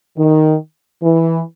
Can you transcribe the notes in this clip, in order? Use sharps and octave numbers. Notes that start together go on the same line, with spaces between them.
D#3
E3